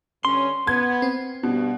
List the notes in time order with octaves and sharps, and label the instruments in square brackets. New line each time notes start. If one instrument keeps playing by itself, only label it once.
[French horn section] G2 D3 C#4 [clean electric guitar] C6
[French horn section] B3 [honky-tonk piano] G#6
[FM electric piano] C4
[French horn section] G2 [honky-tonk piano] B2